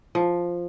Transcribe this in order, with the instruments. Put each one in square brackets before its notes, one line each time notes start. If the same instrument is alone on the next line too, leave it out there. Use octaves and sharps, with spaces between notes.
[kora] F3